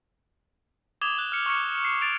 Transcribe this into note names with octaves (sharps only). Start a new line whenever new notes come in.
D6 D#6 G#6 E7 F7 G7
F#6
F6 C#7
C#6 F6 C#7
C7
A6 D7 F7